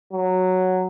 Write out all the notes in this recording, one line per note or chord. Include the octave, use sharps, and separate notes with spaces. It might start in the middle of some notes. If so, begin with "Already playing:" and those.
F#3